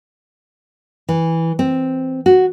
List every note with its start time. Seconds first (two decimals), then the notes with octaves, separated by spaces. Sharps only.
1.09 E3
1.59 C4
2.26 F#4